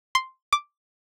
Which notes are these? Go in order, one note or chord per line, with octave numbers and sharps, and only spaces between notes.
C6
D6